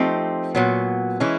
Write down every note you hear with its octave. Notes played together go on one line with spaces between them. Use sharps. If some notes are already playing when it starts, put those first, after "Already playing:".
Already playing: F3 A3 C4 D#4 G4
A#2 F#3 B3
E3 G#3 C#4 E4